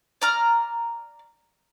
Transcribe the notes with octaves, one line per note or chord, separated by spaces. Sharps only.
D5 A#5 F6